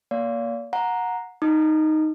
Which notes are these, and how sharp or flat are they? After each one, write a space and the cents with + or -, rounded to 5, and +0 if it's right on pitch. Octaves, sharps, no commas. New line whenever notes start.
A#3 +10 D5 -40 F5 +0
F#5 -20 A#5 +0
D#4 +0 D#6 -40